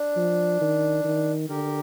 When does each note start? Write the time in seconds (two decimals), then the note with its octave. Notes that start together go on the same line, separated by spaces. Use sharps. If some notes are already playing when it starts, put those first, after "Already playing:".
Already playing: D4
0.16 F3
0.61 D#3
1.04 D#3
1.49 D3 G4 A#4